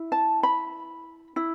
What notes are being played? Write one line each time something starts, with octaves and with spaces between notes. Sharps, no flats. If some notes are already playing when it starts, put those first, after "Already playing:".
Already playing: E4
A5
B5
E4